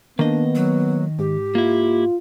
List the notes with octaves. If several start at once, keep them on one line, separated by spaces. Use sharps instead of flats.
D#3 A#3 B3 D4 D#5
F#3
G#2 G4
A#3 E4 F4